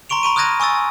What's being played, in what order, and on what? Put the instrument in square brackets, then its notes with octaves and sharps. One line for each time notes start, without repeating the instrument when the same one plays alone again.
[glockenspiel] A#5 C6 C#6 D7 F7
A#5 B5 C#6 D#7
D#6 F6 F#6 G#6 A#6 D#7
G#5 C#6 D#6 E6 A6